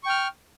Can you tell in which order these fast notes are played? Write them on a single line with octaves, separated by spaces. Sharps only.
C#6 G5 F6